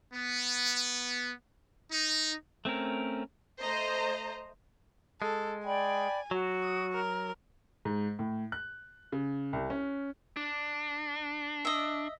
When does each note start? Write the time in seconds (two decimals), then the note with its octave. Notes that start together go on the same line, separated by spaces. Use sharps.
0.13 B3
1.91 D#4
2.65 A3 C4 C#4 A#4
3.61 A3 C5 D#5 A#5
5.22 G#3 A4
5.66 D5 G5 G#5 B5
6.31 F#3 F#4
6.63 D#6
6.92 A#4
7.85 G#2
8.19 A2
8.52 F#6
9.12 C#3
9.53 C2
9.70 C#4
10.36 D4
11.65 D#5 E5